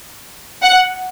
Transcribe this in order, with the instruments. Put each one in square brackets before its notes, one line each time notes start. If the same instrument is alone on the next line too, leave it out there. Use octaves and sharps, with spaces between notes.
[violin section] F#5